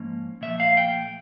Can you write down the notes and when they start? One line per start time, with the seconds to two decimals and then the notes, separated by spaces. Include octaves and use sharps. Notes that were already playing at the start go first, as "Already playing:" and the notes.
Already playing: G#2 F3 A#3 C#4
0.41 A#2 F3 A3 E5
0.60 F5
0.77 G5